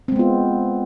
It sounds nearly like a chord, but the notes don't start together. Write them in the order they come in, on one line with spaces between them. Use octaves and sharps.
C4 G#3 B3 F4